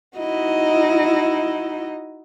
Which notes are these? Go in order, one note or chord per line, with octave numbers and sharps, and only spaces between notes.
D#4 E4 F#4 D#5